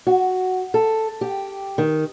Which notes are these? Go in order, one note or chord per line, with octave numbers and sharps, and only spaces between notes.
F#4
A4
G4
D#3